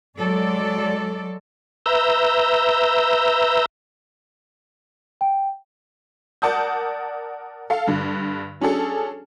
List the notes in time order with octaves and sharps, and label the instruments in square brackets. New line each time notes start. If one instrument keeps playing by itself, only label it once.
[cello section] F#3 G#3 A4 D5
[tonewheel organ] B4 E5 A#5 E6 G6
[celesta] G5
[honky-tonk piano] A#4 D5 F#5 A5 D#6 G6
A4 F5
G2 D3
F#3 C#4 D4 G#4 A4